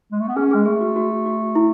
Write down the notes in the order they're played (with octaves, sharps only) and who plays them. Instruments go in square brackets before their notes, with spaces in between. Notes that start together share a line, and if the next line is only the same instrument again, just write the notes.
[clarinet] G#3
A3
B3
[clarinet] C#4 [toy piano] G#4
[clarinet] G#3 [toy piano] G#4
[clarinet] A3 [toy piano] G#4
[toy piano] F#4
F#4
F#4
E4